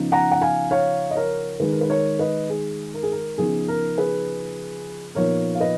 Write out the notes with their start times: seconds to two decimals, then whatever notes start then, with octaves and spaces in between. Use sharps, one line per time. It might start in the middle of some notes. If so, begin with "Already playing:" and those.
Already playing: C#3 F3 B3 D#4
0.12 F#5 A#5
0.31 F#5
0.41 F5 G#5
0.71 C#5 F5
1.11 D#5
1.15 A#4 C#5
1.60 D#3 G#3 D#4 G#4 B4
1.72 A#4
1.81 B4
1.90 A#4 C#5
2.19 B4 D#5
2.50 G#4
2.94 A#4
3.03 G#4
3.12 A#4
3.38 C#3 F3 B3 D#4 G#4
3.68 A#4
3.97 G#4 B4
5.15 A#2 F3 B3 D#4 A#4 C#5
5.55 F5
5.60 B4 D#5